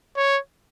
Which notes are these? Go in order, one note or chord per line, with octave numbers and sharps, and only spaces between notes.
C#5